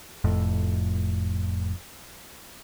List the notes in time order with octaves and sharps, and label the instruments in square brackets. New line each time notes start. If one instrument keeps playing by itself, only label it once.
[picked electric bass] F1 F2 A2